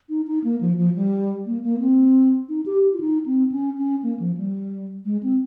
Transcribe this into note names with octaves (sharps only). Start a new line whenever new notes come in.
D#4
D#4
A#3
F3
F3
G3
A#3
A#3
C4
D#4
G4
F4
D#4
C4
C#4
C#4
A#3
F3
G3
G#3
C4